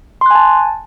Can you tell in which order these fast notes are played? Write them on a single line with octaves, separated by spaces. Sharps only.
C6 F#6 G#5 A5